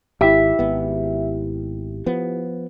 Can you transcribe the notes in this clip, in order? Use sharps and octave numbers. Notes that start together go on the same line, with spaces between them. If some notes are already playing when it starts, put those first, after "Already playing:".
G#1 E4 G4 E5
G#1 B3
F3 B3